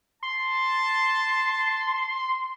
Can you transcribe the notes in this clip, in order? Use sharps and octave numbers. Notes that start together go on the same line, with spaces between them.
A5 C6